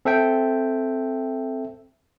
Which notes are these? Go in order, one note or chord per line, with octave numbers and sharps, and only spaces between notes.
C4 A4 E5 G5